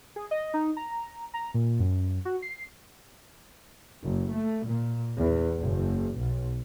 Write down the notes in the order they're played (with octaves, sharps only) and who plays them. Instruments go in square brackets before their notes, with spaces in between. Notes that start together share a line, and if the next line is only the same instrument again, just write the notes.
[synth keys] G#4
D#5
D#4
A#5
A#5
A#2
F#2
F#4
C7
[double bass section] F#1
A3
A#2
E2
F#1
B1